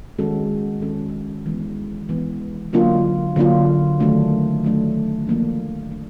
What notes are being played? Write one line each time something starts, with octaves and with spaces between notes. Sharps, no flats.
D#3 G#3 C#4 F#4 A4
D#3 G#3 C#4 F#4 A4
E3 G#3 B3
E3 G#3 B3
D3 F#3 A#3 D4 F4
D3 F#3 A#3 D4 F4
D#3 F#3 A3 D4
D#3 F#3 A3 D4
F3 A#3 D4
F3 A#3 D4